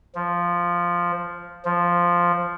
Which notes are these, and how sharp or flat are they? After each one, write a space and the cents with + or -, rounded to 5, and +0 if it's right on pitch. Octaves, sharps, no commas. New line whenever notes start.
F3 +0
F3 +0